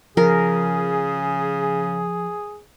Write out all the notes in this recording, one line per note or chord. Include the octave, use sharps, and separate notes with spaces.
C#3 F3 G#4 A#4